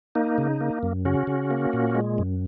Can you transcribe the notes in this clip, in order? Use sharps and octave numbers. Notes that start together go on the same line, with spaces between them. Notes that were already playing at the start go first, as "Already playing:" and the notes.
A#3 D#4
C#3
A#3
F#2
C#3 C#4 F#4
C#3
A#3
A#2
G#3
F#2